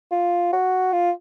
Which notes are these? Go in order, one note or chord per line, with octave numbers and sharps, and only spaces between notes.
F4
F#4
F4